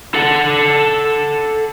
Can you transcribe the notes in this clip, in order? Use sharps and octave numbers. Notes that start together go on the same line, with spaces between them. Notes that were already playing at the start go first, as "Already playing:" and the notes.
A4 F#5